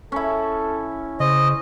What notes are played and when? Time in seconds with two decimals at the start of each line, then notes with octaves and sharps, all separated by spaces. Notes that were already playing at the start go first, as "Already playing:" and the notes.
0.12 C#4 E4 A4
1.20 C#3 C5 D#5